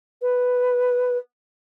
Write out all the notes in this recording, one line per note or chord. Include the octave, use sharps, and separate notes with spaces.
B4